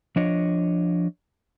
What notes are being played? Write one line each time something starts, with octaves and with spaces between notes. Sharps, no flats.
F3 D4 C#5 D#5